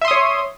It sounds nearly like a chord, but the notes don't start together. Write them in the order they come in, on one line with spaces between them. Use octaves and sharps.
E5 C6 D#6 C#5